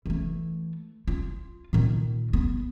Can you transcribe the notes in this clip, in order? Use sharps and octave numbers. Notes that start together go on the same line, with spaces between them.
E3 A3
F4
A#2 D#3
B3